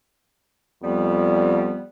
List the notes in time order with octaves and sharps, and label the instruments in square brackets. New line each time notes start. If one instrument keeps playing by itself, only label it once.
[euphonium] F2 [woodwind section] G3 B3